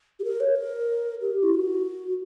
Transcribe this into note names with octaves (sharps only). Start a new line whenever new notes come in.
G4
A#4
C#5
A#4
G4
E4
F#4